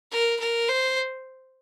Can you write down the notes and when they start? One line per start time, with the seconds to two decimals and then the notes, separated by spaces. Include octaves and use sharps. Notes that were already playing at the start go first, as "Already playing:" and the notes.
0.11 A#4
0.40 A#4
0.68 C5